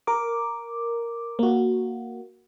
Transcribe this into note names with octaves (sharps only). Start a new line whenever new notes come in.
A#4 D6
A#3 F#4